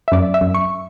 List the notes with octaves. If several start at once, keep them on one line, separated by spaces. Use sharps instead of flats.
E5
F#2 D5
E5
F#2
C#6